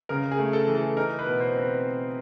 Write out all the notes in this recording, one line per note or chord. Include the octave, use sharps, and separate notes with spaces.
C#3 A#4
G#4
A3
A4
E3
A4
D#4 A#4
B4
B2
C5
C4
B4